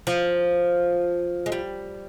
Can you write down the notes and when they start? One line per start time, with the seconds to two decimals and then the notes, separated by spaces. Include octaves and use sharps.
0.07 F3
1.46 G#3
1.52 G3